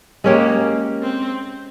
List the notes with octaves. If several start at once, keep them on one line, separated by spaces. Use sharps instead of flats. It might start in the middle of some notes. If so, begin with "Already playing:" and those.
G#3 A#3 C#4 G4
C4